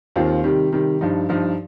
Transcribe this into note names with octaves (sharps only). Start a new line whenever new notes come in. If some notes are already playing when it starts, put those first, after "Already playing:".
D#2 D#3 C4 F4
C3 D#3 G3
C3 D#3 G3
G2 F3 D#4
G2 F3 D#4